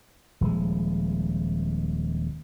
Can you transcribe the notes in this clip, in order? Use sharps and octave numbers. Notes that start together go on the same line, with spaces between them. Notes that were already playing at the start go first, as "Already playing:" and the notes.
D#1 F3 G#3